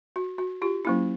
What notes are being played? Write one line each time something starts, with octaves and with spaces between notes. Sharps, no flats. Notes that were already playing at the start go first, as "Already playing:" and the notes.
F#4
F#4
F4 G4
F#3 A#3 C#4 E4